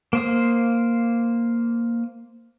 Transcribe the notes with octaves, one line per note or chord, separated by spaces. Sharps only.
A#3 C5 D#6